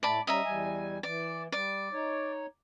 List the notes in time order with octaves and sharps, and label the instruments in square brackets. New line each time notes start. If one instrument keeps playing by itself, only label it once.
[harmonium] A2 A3 [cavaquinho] D5 A5 B5
[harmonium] G3 C#4 [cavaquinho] D#5 E5 A#5
[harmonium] E2 G3 G#5
[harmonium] E3 [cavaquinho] D5
[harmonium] G3 [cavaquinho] D5
[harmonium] D#4 C#5